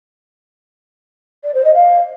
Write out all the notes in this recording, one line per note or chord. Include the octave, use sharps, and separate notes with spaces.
D5
C5
D#5
F5